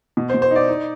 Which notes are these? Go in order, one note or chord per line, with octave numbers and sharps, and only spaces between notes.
B2
C5
B2
C5
D#4 D5
D#4